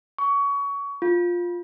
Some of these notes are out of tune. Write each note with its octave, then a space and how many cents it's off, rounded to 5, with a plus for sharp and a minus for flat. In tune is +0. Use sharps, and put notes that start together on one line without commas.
C#6 +25
F4 +10